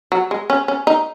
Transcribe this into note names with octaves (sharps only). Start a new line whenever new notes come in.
F#3
G#3
C#4
C#4
D#4